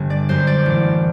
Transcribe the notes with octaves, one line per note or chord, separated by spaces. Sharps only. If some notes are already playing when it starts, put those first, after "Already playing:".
Already playing: G1
D5
F#2 F#3 C5
D5
A1